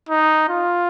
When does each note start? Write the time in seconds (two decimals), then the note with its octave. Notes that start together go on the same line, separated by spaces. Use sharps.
0.09 D#4
0.49 F4